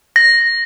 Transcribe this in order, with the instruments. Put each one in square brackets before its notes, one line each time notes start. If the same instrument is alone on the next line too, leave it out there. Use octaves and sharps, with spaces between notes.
[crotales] A#6